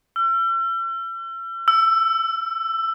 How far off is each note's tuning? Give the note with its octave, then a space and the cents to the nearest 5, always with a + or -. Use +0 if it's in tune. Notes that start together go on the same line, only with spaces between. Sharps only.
E6 +45
E6 +15